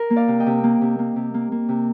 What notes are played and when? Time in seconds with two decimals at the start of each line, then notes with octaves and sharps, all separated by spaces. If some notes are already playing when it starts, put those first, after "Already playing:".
Already playing: A#4
0.10 A#3
0.16 D5 F5
0.28 C3
0.40 D#5 G5
0.46 C3
0.64 A#3
0.81 C3
0.99 A#3
1.16 C3
1.34 A#3
1.52 A#3
1.69 C3